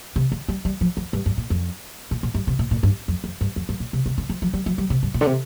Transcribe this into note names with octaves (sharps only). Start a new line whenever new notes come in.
C3
D3
G3
G3
F3
F2
G2
G2
A#2
F2
A#2
A#2
G2
C3
A#2
A#2
G2
F2
F2
G2
F2
G2
A#2
C3
C3
D3
F3
F3
G3
F3
G3
C3
G2
A#2
D3
C3